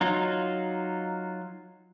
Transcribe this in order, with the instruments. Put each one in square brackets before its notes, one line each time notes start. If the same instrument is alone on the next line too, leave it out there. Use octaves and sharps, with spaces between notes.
[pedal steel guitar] F#3 D#4 F4